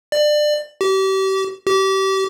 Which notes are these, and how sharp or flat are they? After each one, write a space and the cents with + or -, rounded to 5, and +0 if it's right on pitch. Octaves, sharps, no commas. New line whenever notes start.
D5 +25
G4 -35
G4 -30